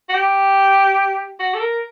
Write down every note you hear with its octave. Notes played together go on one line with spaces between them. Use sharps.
F#4
G4
F#4
A4
A#4